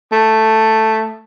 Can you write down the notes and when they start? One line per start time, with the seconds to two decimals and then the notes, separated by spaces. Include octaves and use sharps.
0.12 A3